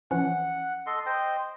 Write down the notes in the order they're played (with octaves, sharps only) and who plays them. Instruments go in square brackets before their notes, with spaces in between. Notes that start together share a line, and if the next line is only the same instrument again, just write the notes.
[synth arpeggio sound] E3 F3 C#4 [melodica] F#5
[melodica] A4 D#5 C6
C5 D#5 G5